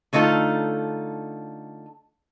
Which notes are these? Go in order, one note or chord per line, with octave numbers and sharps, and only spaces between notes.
D3 A3 D#4 F4 A4